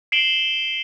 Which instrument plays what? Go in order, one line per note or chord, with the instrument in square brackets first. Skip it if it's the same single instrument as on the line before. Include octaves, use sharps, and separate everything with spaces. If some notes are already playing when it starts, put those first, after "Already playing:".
[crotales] C7 D7 E7 F#7 G7